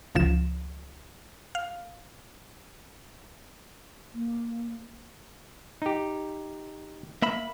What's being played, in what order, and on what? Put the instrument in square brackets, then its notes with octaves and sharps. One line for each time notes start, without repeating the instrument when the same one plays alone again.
[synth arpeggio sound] G1 C#2 F3 E7
F5
[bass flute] A#3
[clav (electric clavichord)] D#4 G4
[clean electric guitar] A#3 E5 B5